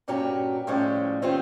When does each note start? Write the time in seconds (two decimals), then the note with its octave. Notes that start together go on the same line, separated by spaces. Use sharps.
0.08 G2 A#2 C#4 F#4 G4 A#5
0.67 A2 F3 G3 G#3 C#4 G4
1.22 D#3 C4 C#4 F4 G4 C5